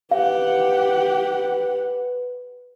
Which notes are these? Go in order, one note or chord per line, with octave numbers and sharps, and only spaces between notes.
G4 B4 F5 F#5